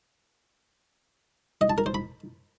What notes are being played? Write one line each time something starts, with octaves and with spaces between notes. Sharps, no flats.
D#5
A5
A#4
C5
B5